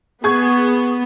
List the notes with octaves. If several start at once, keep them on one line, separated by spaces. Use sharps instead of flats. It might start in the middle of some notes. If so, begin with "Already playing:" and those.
B3 G#4 C#6 G#6